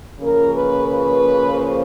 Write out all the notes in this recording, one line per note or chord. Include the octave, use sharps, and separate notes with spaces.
C#3 F3 A#3 A#4
B4
B4
C5